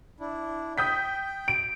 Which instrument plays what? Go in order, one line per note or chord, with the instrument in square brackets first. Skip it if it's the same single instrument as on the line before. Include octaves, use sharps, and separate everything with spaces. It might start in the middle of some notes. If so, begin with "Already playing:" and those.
[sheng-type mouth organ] D4 E4
[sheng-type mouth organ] G5 [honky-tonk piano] D#6 G6 B6
[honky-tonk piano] D7